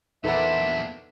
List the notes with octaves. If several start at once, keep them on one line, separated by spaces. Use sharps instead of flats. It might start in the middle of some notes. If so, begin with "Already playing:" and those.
E2 A#2 D4 D#4 A4 B4 E5 F#5